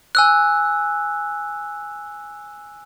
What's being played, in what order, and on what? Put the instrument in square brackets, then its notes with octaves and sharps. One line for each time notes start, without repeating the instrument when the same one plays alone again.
[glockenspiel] G#5 E6 F#6